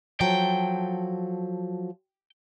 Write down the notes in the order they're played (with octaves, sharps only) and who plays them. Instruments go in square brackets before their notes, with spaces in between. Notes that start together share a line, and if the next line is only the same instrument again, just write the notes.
[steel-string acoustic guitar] F3 F#3 A4 [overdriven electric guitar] G5